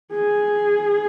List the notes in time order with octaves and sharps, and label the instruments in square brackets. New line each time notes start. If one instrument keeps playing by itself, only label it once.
[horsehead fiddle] G#4